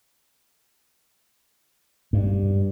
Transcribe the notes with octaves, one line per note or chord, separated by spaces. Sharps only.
G2